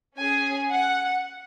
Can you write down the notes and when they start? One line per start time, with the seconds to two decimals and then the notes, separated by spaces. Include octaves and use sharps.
0.16 C#4 G#4 G#5
0.71 F#5